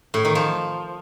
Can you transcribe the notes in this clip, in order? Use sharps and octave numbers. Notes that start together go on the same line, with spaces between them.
A2
D#3
F3